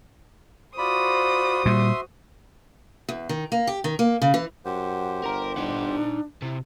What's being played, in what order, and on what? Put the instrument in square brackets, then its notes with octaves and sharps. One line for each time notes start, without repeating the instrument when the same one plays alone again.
[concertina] F4 D5 B5 [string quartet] F#4 C5 D#6
[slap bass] A#2 G3 [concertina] E5 C6
[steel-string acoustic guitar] E2
D#3
A#3
G4
D#3
A#3
C#3
E3
[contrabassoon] F#2 [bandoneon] G4 C5 [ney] F#5
[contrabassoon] G1 [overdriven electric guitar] A#4 A#5
[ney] D4 [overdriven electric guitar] D#4 F#5
[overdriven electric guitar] C3 [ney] E4